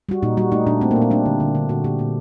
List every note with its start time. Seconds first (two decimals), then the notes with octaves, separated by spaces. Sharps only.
0.09 G3 F#4
0.23 A#2 D#4
0.37 G3 F#4
0.52 A3 D#4
0.66 A#2 D4
0.81 A3 C4
0.91 A#3
0.96 A#2
1.02 C4
1.11 G3 D4
1.26 D3
1.40 D3
1.55 D3
1.69 A#2 F#4
1.84 A#2 G4
1.99 A#2